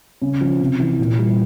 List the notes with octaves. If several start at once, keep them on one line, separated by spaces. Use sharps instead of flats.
C#3
F3
C3
E3
A#2
G3